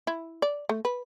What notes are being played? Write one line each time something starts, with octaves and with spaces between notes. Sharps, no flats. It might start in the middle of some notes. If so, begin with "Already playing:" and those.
E4
D5
A3
B4